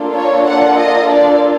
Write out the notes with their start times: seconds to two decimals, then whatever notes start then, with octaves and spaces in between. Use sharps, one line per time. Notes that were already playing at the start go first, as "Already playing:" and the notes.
Already playing: A#3 D4 F4 A4
0.16 C#5
0.46 F#5
0.76 D#5
1.06 D5